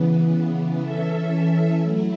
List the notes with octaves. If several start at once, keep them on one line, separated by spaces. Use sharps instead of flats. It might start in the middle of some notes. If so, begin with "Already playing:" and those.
Already playing: C#3 E3 B3
E3 C#4 A4 E5
F#3 A3 E4